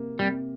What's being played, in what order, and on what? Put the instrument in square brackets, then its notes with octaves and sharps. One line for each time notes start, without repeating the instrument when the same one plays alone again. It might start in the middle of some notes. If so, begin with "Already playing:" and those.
Already playing: [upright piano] C3 A#3
[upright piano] C3 [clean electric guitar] G3